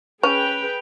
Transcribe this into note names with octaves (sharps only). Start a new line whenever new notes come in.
C#4 G#4 B4 G5 F7